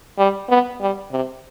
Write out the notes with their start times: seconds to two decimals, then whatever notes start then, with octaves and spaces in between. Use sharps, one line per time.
0.18 G3
0.49 B3
0.81 G3
1.12 C3